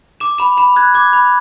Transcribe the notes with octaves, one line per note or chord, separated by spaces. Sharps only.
D6 E7
B5 E7
B5 E7
F#6 G#6
D6 G#6
B5